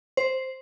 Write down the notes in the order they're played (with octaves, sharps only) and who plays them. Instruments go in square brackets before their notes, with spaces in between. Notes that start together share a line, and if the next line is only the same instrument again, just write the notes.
[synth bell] C5